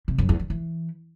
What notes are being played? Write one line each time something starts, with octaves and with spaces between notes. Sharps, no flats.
C3
F#2
E2
D#3
E3